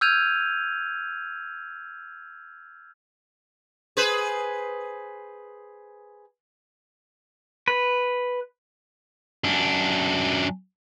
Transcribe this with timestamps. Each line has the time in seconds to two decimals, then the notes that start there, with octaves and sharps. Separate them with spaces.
0.01 E6 F6 G6 G#6 D#7 F7
3.97 G#4 B4 C5
7.68 B4
9.44 F#2 D4